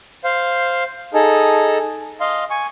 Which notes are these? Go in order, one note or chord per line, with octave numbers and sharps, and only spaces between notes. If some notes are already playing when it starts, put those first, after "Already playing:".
C5 F5
D#4 G#4 A4
D#5 F5 C6
G#5 C#6